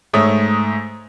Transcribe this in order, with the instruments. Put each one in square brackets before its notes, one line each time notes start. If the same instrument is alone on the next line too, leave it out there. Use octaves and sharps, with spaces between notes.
[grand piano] G#2 A3 C#5 D#6